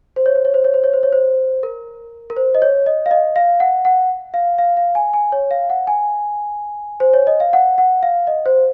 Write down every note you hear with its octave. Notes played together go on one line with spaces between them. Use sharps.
C5
C#5
C5
C#5
C5
C#5
C5
C#5
C5
C#5
C5
A#4
A#4
C5
D#5
C#5
D#5
F5
D#5
F5
F#5
F#5
F5
F5
F5
G#5
G#5
C#5
F5
F#5
G#5
C5
C#5
D#5
F5
F#5
F#5
F5
D#5
C5